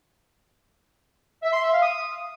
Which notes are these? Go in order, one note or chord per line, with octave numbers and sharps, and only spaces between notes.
E5
C6
E5
F5
D#6